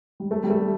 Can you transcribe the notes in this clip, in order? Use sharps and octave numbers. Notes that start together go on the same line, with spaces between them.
G3
A3
G3
A3